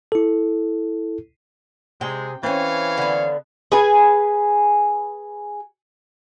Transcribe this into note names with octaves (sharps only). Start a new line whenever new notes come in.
E4 A4
C3 G#3 G#4 G5
E3 C4 C#4 C#5 F5
D3 B3
G#4 B4 G#5